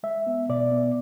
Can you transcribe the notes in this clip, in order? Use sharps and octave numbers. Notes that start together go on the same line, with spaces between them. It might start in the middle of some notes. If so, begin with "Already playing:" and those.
G#3 E5
B3
B2 D5
B3